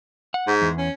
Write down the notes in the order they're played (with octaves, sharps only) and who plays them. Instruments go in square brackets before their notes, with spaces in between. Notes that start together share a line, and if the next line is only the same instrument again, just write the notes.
[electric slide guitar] F#5
[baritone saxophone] G#2
[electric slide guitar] E2
[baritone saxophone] C#4